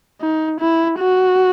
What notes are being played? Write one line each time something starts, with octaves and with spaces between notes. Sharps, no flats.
D#4
E4
F#4